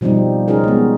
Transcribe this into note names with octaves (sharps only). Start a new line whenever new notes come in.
B2 F3 G3 C4 D#4
C#4 D#4 F4 G#4 A#4
G#3 B3